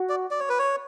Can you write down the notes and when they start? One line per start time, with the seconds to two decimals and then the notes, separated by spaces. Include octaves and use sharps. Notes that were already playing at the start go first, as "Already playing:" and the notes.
Already playing: F#4
0.09 D5
0.31 D5
0.40 C#5
0.49 B4
0.59 C#5